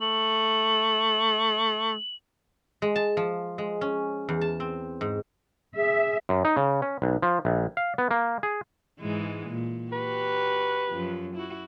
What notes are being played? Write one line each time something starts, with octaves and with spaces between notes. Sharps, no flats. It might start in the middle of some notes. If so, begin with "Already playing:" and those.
A3 F#7
G#3
A5
F3
G#3
C#4
E2
A5
C4
G#2
G#4 E5
F#2
D#4
C#3
C#4
B1
F3
A#1
F5
B3
A#3
G#4
G#2 E3 G#3
A#2
F#4 G4 B4
F#2 F3
E4 F#4